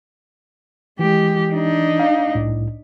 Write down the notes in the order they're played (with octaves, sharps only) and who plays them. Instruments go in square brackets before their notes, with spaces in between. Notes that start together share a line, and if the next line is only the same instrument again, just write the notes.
[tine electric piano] E3 [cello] G#3 G4
[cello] D4 D#4
[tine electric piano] F5
C2 A2